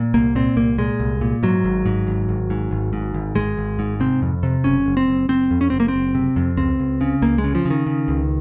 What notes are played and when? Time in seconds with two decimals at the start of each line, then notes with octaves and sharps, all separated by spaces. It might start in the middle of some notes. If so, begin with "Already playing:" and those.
Already playing: A#2
0.14 C2 A#3
0.35 A#2 C4
0.56 C2 A#3
0.78 A#2 G#3
1.00 C2
1.21 A#2
1.43 G#2 F#3
1.64 G#1
1.86 G#2
2.07 G#1
2.29 G#1
2.50 G#2
2.71 G#1
2.93 G#2
3.14 G#1
3.35 G#1 G#3
3.57 G#1
3.79 G#2
4.00 C3 C4
4.22 F2
4.43 C3
4.64 F#1 C#4
4.86 F#1
4.97 C4
5.08 F#1
5.29 F#1 C4
5.51 F2
5.61 C#4
5.70 F#1 C4
5.80 A#3
5.88 C4
5.94 F#1
6.15 C3
6.36 F2
6.57 C#2 C4
6.80 C#2
7.01 C#3
7.22 C#2 A#3
7.38 G#3
7.44 C#3
7.55 F3
7.65 C#3
7.71 D#3
7.87 C#3
8.08 C#2